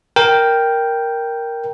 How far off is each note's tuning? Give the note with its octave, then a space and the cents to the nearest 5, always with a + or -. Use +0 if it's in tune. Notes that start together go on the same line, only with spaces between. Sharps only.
A#4 +0 G5 +0